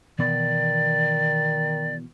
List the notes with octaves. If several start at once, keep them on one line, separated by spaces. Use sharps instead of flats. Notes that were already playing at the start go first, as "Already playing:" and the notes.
B2 D#3 E3 B3 D5